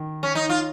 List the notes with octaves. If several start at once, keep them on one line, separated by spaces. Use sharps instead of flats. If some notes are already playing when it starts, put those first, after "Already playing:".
Already playing: D#3
C#4
D#4
F4